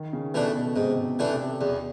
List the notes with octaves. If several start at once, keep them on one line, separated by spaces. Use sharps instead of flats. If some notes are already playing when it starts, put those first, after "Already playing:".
Already playing: D#3
C#3
B2 E3 A3 D4
B2
G#2 C3
B2 E3 A3 D4
C3
E2 B2